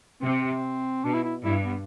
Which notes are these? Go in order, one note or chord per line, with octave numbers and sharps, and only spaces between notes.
C3 C4
B2 D4
E4
E4
G2 E4
B3